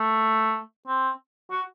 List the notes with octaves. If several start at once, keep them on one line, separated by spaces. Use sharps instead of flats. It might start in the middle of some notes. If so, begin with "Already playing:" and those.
Already playing: A3
C4
F#4